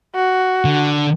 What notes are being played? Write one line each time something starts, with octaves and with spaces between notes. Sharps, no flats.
F#4
D3